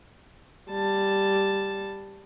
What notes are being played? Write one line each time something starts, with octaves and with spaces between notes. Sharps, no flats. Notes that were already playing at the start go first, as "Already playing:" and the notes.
G3 A5